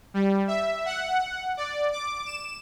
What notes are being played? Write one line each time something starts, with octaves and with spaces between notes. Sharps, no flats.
G3
E5
F#5
D5
D6
E7